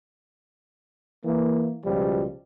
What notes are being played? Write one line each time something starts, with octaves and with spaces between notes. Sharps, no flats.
E3 A#3
C#2 B2 F3 G3